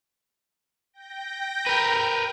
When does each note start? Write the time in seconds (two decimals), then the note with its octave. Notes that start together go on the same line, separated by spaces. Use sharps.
0.93 G5 G6 A#6
1.67 A#4 B4